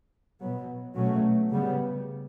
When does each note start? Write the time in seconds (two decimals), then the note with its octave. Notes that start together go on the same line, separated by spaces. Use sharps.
0.42 B2 F#3 B3
0.96 B2 F#3 A3 C#4
1.51 C#3 G3 B3